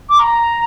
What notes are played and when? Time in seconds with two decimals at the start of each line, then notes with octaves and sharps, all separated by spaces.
0.09 D6
0.19 A#5